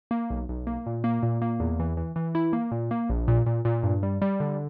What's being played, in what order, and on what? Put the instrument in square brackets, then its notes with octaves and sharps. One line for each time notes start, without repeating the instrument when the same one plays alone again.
[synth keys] A#3
B1
B1
A#3
A#2
A#3
A#2
A#3
E2
E3
E3
E3
E4
A#3
A#2
A#3
A#1
A#2
A#2
A#2
G2
G3
G3
D3